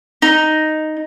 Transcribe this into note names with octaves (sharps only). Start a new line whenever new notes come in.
D#4